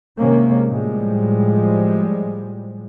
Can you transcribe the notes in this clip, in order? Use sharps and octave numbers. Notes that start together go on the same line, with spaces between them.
C3 D#3 G#3 A#3 C#4
A2 F3 G3 G#3